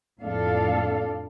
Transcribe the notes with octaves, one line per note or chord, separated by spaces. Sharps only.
F2 A2 D4 A4 F5